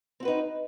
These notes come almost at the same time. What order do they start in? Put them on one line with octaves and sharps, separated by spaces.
C4 F#4 B4 D#4